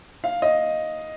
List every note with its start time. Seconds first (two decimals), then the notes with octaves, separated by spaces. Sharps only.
0.24 F5
0.42 D#5